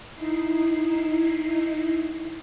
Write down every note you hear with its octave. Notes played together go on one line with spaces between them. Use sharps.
D#4 E4 C7